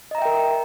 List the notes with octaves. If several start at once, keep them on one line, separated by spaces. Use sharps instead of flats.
A#4 D#5 E5 G5 A#5